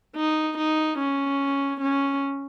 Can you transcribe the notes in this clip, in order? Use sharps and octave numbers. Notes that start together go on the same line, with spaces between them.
D#4
D#4
C#4
C#4